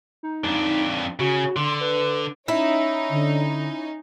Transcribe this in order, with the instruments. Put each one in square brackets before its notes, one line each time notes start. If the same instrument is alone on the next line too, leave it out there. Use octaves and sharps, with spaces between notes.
[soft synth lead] D#4
[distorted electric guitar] F2 D4
[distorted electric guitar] C#3 [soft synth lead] F#4
[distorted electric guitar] D3 [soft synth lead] C6
[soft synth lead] B4
[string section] C#4 D#4 [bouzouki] E4
[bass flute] D3